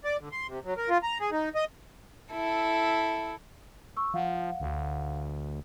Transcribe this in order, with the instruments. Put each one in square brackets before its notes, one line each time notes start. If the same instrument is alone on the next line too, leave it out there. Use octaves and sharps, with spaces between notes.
[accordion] D5
D3
C6
C3
F#3
A#4
F4
A#5
G#4
D#4
D#5
[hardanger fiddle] E4 A4
[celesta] C#6 E6
[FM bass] F3 [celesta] F5 F#5
[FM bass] D2